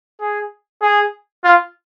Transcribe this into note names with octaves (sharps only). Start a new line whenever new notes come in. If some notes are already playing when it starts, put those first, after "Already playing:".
G#4
G#4
F4